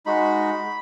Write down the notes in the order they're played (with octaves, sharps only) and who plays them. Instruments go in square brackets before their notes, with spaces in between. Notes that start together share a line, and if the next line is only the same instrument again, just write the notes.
[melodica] G#3 D#4 F#4 B5